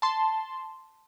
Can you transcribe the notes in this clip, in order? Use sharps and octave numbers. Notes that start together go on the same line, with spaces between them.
A5 C6